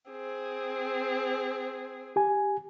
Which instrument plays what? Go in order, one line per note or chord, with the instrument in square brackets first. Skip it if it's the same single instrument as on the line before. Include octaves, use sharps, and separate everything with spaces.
[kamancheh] C4 G#4
[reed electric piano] G4 G#5